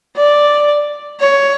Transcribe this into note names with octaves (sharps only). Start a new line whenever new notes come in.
D5
C#5